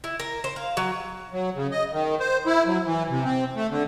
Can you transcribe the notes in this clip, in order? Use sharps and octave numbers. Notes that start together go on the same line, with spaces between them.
E4
A#4
C5
F5
F#3
F#3
C#3
D#5
D#3
C5
E4
F#3
E3
C3
C4
A3
D3